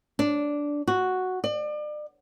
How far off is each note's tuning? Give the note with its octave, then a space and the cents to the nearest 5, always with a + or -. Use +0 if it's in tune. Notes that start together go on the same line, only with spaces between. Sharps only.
D4 -10
F#4 +0
D5 +35